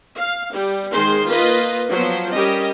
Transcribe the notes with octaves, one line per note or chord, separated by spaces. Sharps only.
F5
G3
D#3 G#3 G#4 C5 C6
A#3 F4 B4 D#5
F3 F#3 B3 C5
G3 C#4 G4 A#4 D#5